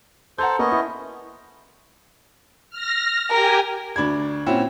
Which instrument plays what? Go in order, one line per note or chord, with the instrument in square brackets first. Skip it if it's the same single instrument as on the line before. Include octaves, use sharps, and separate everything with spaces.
[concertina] A4 C5 [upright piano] F#5 A#5 G6
[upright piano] A#3 [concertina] B3 C#4 D#5
[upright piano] E4
[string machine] F6 A#6
[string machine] G4 G5 G#5 [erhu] A#4
[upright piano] D2 D4 B5 G#6
A#2 C4 C#4 E4 F#4